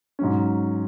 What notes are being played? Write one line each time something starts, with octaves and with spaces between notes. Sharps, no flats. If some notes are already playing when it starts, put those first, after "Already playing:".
G#2 F#3 C#4